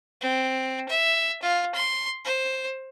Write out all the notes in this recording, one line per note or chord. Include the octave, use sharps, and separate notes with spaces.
C4
E5
F4
C6
C5